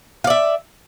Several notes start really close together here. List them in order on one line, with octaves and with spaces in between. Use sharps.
F5 D5 E5